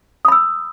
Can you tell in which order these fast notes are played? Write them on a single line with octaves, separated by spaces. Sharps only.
D#6 B5 E6